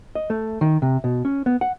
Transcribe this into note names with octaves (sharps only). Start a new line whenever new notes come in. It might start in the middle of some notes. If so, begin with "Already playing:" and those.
D#5
A3
D#3
C3
B2
C#4
B3
F#5